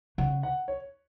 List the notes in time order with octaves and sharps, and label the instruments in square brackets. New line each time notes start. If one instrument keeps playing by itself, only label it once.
[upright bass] C#3 [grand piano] F#5
[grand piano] F#5
C#5